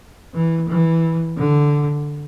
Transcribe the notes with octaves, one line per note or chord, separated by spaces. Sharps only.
E3
E3
D3